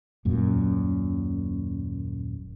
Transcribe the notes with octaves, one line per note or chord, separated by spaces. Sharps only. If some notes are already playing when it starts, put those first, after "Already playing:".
D#1 F#2 A#2